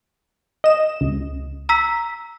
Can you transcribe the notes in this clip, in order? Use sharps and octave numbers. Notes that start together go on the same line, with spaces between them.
D#5 E7
C#2
A#5 E6 B6